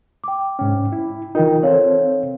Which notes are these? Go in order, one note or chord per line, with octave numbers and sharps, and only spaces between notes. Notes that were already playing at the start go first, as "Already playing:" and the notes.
G5 D6
G#2 C#4 G5
E4
E3 D#4 F4 A#4 G5
C4 A4 C5 C#5 F5